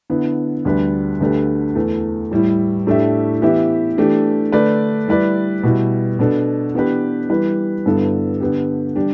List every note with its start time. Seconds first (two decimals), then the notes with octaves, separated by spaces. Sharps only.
0.10 D3 B3 E4
0.65 D2 D3 G3 D4 B4
1.21 D2 D3 A3 G4 B4
1.75 E2 E3 A3
2.31 A2 G3 E4
2.87 A2 A3 D4 G4 E5
3.42 E3 B3 E4 G4 E5
3.98 E3 A3 D4 G4
4.52 D3 A3 D4 B4 D5
5.08 G3 E4 B4 D5
5.64 B2 G3 E4
6.19 B2 B3 D4 A4
6.74 E3 B3 D4 G4 B4
7.30 E3 G3 E4 B4
7.86 G2 D3 B3 E4 A4
8.40 D3 B3 G4
8.95 D3 G3 D4 G4